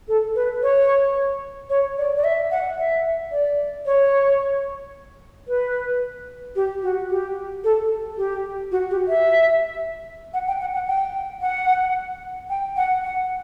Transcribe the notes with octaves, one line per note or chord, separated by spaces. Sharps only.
A4
B4
C#5
C#5
D5
D5
E5
F#5
E5
D5
C#5
B4
G4
F#4
G4
A4
G4
F#4
G4
E5
F#5
G5
F#5
F#5
G5
F#5
G5
F#5
F#5